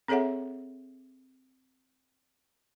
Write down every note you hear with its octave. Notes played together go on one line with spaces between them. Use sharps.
C4 G#4 A4 C#5 E5 F#5